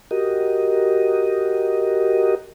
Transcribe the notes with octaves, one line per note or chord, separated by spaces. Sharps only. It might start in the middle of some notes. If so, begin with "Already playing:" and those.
F#4 G4 A#4 D#5